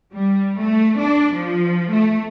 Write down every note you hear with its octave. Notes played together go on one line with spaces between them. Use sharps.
G3
A3
D4
F3
A3